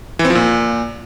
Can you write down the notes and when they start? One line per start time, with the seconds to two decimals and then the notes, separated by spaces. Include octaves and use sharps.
0.19 E3
0.25 C4
0.30 F3
0.35 A#2